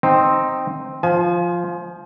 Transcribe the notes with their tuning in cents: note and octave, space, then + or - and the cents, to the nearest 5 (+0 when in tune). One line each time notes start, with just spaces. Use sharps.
C4 +0 D#4 +0
F3 +0 G#5 +40